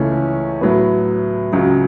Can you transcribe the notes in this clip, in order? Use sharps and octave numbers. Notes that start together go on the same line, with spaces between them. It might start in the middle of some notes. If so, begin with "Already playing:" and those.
Already playing: C#2 C#3 E3 A3 C#4
A2 F#3 B3
C#2 C#3 F#3